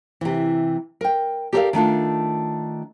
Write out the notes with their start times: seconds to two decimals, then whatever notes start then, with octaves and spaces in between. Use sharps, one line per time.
0.21 C3 E3
1.01 A#4 G5
1.53 G4 A4 A#4 C5 D5 F5
1.73 D#3 A3 D4 F4